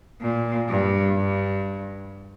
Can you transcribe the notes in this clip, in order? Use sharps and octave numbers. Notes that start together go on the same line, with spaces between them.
A#2
G2
G2